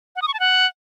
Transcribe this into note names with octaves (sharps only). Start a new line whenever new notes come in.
F#5
D#6
C#6
A5
F#5